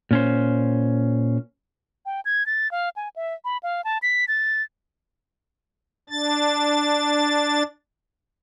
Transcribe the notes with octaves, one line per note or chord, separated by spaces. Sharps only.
A#2 C#4 C5
G5
G#6
A6
F5
G#5
E5
B5
F5
A5
B6
A6
D4 A6